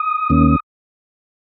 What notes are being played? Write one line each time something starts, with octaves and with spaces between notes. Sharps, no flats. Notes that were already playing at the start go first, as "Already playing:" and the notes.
Already playing: D#6
D#2 D#3 A#3 C#4